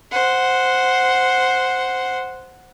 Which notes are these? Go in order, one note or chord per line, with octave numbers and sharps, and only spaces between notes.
C5 F#5